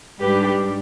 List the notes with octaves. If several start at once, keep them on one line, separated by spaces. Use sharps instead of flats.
G#2 G3 D4 G4 B4